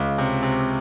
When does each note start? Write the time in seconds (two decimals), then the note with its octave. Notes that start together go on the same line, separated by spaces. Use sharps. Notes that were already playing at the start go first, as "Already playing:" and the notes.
Already playing: C#2
0.18 C3
0.43 C3